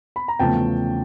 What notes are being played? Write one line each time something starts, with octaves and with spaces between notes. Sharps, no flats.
B5
A#5
E2 C#3 F3 A3 G5 A5